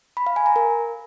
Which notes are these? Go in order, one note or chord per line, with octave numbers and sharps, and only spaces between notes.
B5
F5
G#5
A#5
A#4